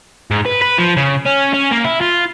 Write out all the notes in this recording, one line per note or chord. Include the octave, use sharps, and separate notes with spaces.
G#2
B4
B4
F3
C#3
C#4
C#4
A#3
E4
F4